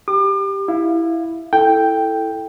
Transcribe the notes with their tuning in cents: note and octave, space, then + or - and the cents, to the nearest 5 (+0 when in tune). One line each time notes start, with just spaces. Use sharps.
G4 +0 D6 +40
E4 +0 F5 +0
E4 +0 A4 +0 G5 +0